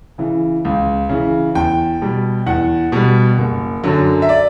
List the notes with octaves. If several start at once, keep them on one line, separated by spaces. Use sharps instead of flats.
C#3 E3
C#2
C#3 E3
E2 G5
B2 G3
E2 F#5
B2 G3
F#1
F#2 D3 F#3
E5
D5